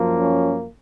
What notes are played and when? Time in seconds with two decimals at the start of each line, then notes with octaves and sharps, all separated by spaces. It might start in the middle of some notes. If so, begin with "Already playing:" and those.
Already playing: F#2 F3 A#3
0.19 C#4